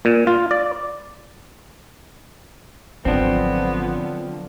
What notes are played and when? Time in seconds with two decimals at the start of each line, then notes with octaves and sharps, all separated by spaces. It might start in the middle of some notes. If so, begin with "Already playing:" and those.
0.05 A#2
0.27 F4
0.51 D5
3.05 G#1 D3 F3 F#3 B3 C4 D4